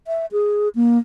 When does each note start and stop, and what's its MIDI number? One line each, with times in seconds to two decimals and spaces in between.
0.07 0.26 76
0.32 0.69 68
0.75 0.98 58